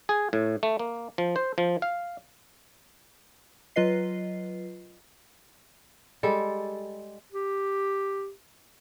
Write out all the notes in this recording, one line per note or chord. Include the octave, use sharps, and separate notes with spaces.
G#4
A2
A3
A#3
F3
C5
F3
F5
F#3 F4 B4 D#5 C7
G3 G#3 A4
G4